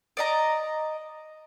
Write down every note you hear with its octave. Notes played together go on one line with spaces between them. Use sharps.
D5 D#5 A#5